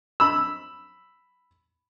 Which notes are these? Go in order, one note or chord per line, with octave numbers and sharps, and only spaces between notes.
B5 E6